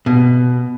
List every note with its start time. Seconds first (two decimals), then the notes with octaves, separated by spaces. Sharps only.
0.06 B2